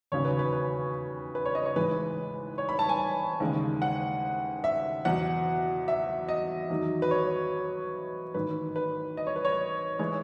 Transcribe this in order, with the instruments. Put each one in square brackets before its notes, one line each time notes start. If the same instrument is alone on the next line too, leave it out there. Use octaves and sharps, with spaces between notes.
[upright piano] E1 D#2 C#3 F#3 C#5
B4
B4
B4
B4
C#5
D#5
C#5
A1 G#2 E3 G#3 B4
C#5
B5
A5
G#5
D#2 C#3 E3 G#3
F#5
E5
E2 B2 F#3 F#5
E5
D#5
E2 D#3 F#3
B4
C#5
A1 G#2 D#3 B4
B4
D#5
C#5
B4
C#5
E3 G#3 C#5